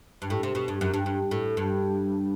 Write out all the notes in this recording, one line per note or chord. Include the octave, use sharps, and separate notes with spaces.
G2
A2
C3
B2
G2
F#2
G2
G2
A2
G2